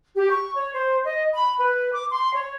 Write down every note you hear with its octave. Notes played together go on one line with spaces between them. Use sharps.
G4
C#6
C#5
C5
D#5
B5
B4
D6
C6
C#5